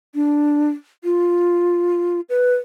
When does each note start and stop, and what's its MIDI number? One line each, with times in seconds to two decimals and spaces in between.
0.15 0.69 62
1.04 2.21 65
2.29 2.55 71